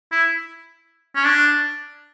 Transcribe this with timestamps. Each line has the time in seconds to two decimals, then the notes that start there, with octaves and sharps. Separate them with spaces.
0.12 E4
1.15 C#4
1.24 D4